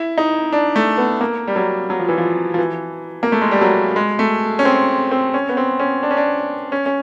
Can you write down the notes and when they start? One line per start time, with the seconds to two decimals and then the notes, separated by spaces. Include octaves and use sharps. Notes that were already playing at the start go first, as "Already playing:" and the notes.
Already playing: E4
0.18 D#4
0.53 D4
0.76 A3
0.98 B3
1.21 A#3
1.47 G3
1.56 F#3
1.90 F#3
1.99 F3
2.08 E3
2.18 F3
2.54 F3
2.58 E3
3.23 A#3
3.32 A3
3.42 G#3
3.51 G3
3.61 F#3
3.96 G#3
4.19 A3
4.59 C#4
4.65 C4
5.11 C4
5.34 C#4
5.49 B3
5.57 C4
5.79 C#4
6.03 D4
6.11 C#4
6.17 D4
6.72 C#4
6.86 C#4